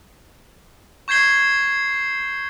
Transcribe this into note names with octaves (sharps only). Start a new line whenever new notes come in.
C#6 G6 G#6 C7 G7